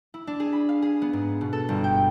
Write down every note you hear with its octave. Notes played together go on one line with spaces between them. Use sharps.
E4
D4
G#4
B5
F5
G#4
B3
G#2
B2
A4
G1
G5